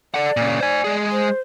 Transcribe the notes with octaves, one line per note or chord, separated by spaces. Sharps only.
A4 D5 F#5
A#2 C#3
C5 G#5
G#3 G#4
C5